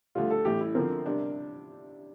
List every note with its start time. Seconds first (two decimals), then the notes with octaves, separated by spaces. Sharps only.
0.15 D2 D3 G3 F4
0.30 A4
0.45 A1 A2 G3 G4
0.61 E4
0.75 D3 F3 C4 A#4
1.06 C3 G3 D4